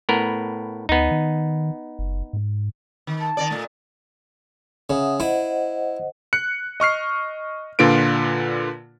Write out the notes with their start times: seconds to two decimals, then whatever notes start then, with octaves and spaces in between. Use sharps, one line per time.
0.09 A2 B3 A#4
0.89 D2 B3 D#4
1.11 D#3
1.99 F#1
2.33 G#2
3.07 D#3
3.21 A5
3.37 D#3 D5
3.51 A#2 A3
4.90 C#3 E5 F#5 D#6
5.20 E4 C5 D#5 F#5
6.33 F#6 C#7
6.80 D#5 C#6 F6 C7
7.79 A#2 D3 F4 B4 D7